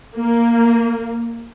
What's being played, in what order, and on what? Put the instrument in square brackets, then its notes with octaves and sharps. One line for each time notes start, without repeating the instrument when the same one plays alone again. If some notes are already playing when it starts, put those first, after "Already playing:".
[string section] A#3